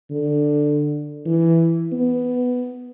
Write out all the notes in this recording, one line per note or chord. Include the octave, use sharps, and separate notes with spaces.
D3
E3
B3